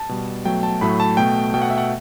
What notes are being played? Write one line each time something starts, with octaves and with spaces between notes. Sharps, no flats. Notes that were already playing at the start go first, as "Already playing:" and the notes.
Already playing: A5
B2 G3
B2 F#3 A3 G5
A5
A2 F#3 A3 B5
A5
B2 A3 G5
B2 A3 G5
F#5
E5
F#5